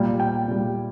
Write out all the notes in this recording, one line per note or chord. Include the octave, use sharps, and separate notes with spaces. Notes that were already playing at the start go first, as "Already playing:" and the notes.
Already playing: A#2 G3
G5
A#2 G3